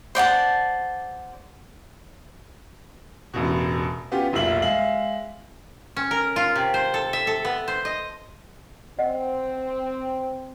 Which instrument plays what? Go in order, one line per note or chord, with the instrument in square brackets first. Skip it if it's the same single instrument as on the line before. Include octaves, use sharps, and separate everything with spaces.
[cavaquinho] C5 D5 F#5 A5
[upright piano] E1 A1 B2
B3 C#4 F4 G4
F1 B1 A#2 F4 E5 F#7
G#3 E5 F5 F#7
[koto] C#4
A#4
F4
C3
C5
A4
E5
A4
B3
C5
D#5
[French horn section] C4 [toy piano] D#5 F#5